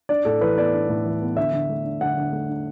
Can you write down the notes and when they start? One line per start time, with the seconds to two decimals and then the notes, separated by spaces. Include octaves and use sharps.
0.09 D4 D5
0.25 A2 A4
0.41 E3 B4
0.57 B3 D5
0.73 D4
0.89 A2
1.05 E3
1.22 B3
1.37 D3 E5
1.53 D3
1.69 A3
1.85 D4
2.01 D3 F#5
2.17 D3
2.33 A3
2.49 D4